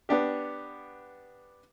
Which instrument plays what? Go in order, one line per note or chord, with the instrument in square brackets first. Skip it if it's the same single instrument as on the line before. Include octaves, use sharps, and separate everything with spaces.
[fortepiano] B3 D4 G4